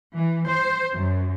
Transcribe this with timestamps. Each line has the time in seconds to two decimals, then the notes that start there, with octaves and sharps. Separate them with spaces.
0.15 E3
0.48 C5
0.95 F#2